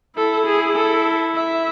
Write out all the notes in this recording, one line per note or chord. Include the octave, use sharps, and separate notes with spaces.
E4 A4
G#4
A4
E5